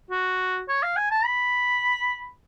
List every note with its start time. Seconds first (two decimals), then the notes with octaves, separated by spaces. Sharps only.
0.10 F#4
0.68 C#5
0.83 F5
0.96 G#5
1.11 A5
1.25 B5